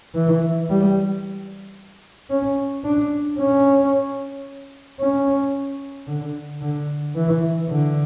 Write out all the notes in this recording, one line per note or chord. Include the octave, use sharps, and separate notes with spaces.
E3
G3
C#4
D4
C#4
C#4
D3
D3
E3
D3